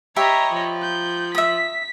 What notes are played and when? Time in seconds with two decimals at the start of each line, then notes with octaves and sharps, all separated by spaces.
0.16 G4 C#5 D#5 E5 A#5 B5
0.52 F3
0.82 G6
1.35 E5 D#6 B6